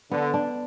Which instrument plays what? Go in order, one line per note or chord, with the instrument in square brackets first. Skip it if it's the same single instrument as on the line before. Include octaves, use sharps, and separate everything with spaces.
[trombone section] D3 [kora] B3
[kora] D4